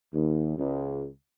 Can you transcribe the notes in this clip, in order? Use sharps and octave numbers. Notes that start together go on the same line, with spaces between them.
D#2
C#2